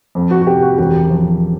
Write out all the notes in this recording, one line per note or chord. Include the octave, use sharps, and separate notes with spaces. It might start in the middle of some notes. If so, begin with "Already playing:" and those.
F2
F#4
F#4
C3 G4
F#4
E1 G4
F3